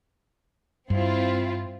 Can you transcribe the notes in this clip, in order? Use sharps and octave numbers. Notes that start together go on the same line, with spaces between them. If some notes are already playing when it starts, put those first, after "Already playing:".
G2 C4 E4 F4